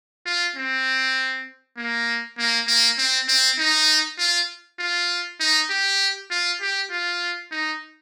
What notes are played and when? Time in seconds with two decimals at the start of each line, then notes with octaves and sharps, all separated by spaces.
0.26 F4
0.56 C4
1.77 A#3
2.38 A#3
2.67 A#3
2.98 C4
3.28 C4
3.58 D#4
4.18 F4
4.79 F4
5.40 D#4
5.70 G4
6.31 F4
6.61 G4
6.91 F4
7.51 D#4